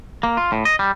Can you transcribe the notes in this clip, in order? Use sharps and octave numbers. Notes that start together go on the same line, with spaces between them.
A#3
F4
A2
D#5
G3